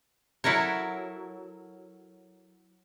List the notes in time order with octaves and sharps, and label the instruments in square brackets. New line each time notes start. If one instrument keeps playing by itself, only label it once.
[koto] F#3 E4 A4 A#4 C#5